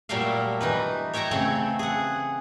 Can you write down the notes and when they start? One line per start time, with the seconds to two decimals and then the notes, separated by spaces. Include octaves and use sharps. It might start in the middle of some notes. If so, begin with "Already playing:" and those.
0.09 A#2 F#3 G3 A3 E5 F5
0.61 E3 D#4 B4
1.13 C#5 E5 G5 A5 A#5
1.31 C#3 A3 C4 C#5
1.79 G#4 F#5